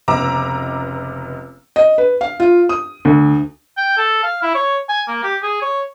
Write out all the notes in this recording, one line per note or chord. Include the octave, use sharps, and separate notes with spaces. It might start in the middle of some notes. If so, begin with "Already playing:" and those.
F1 C#2 B3 A#5 D6 E6
D#5
B4
F5
F4
D#6
D2
G5
A4
F5
E4
C#5
G#5
A#3
G4
G#4
C#5